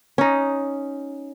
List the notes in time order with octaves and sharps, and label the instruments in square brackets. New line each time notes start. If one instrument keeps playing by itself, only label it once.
[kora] C#4 D#4